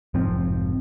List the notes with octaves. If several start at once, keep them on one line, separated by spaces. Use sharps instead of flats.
F1 G#2 F3 C4